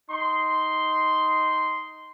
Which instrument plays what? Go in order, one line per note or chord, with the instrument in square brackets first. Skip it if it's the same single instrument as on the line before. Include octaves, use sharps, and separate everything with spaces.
[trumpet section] D#4 C6